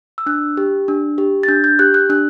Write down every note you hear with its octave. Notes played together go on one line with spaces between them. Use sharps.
E6
D4 F#6
G4
D4
G4
A6
D4 G6
G6
G4 F#6
F#6
D4 F#6